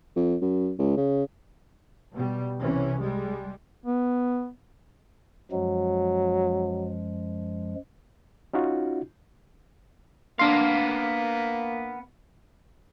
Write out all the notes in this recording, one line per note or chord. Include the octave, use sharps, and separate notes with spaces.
F2
F#2
C#2
C#3
B2 G3
C2 C3 E3 C#4
G3 G#3
B3
F#2 F3 F#3 G#3
C#4 D#4 F4 F#4
A#3 B3 D4 A#4 F5 C6